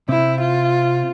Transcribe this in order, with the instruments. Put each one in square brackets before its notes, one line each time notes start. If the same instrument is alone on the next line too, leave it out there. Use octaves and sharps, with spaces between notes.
[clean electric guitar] C3 C4 [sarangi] E4
[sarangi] F4